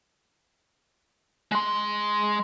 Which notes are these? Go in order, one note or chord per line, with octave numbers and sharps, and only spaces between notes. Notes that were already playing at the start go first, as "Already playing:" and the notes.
G#3 C6